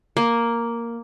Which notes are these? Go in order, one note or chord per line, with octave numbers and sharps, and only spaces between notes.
A#3